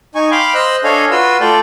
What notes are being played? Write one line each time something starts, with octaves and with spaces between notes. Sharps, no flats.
D#4 G#5 C#6
F5 G5 B5 C6 D6
C5 D#5 E6 F#6
D4 A4 C#5 D#5 F5 G#5
F4 F#4 B4 C6 E6
A3 F4 A4 D5 G5